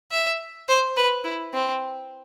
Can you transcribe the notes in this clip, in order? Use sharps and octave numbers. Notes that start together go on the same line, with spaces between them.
E5
C5
B4
E4
C4